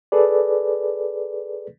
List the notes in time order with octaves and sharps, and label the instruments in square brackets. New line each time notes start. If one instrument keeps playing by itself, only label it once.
[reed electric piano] G#4 A4 B4 D5